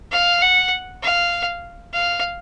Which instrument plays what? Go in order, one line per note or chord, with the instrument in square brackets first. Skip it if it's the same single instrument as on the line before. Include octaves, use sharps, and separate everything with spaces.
[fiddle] F5
F#5
F5
F5